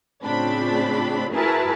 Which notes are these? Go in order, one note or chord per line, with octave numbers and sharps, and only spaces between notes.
A2 C#3 C4 D4 F4 B5
E4 F#4 G#4 A#4 B4 A5